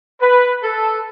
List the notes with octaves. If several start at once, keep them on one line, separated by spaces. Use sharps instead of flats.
B4
A4